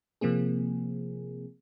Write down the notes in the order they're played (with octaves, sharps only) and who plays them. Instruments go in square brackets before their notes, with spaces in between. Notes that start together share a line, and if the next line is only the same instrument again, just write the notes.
[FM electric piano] C3 F3 A#3 C4 G#4